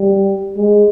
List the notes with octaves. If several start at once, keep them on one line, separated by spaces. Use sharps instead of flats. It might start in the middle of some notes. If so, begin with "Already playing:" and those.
Already playing: G3
G#3